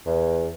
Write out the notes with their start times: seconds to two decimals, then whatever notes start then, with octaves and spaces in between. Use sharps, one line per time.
0.05 E2